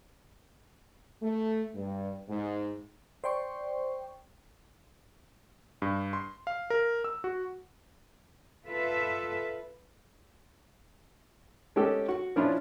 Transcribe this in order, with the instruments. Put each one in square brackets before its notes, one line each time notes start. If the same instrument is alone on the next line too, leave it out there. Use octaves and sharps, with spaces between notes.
[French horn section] A3
G2
G#2
[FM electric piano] C5 D5 G5 C6 C#6
[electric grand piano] G2
C6
F5
A#4
E6
F#4
[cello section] F4 A4 B4 E5
[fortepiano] G#3 C#4 G4 A4
F#4
F3 C#4 D4 E4 F4